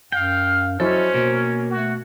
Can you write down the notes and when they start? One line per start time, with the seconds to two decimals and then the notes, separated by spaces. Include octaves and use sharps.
0.12 F#2 F5 G5
0.80 F#3 C#4 E4 A4 C5 D#5
1.14 B2 A#3
1.71 A3 F#4